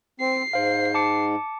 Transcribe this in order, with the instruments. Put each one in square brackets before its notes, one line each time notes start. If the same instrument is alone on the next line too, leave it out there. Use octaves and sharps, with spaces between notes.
[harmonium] C4 [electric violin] C7
[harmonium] G#2 [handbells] C5 F5
[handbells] A5 D6 C#7